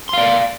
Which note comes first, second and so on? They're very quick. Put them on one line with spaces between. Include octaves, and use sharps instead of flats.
C6 F5 D5